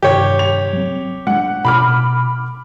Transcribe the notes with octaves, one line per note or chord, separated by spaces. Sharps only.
G2 C3 D#3 G4 C#5
F7
F#3 C4
G#3 D4 F#5
B2 B5 D6 F6